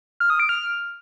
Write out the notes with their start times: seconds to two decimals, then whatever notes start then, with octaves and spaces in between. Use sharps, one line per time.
0.20 F6
0.30 D#6
0.40 D7
0.49 F6